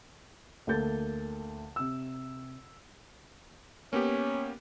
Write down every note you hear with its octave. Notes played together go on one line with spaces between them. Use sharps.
D2 A#3 A4 G6 A6
C3 E6
A#3 B3 C#4 G4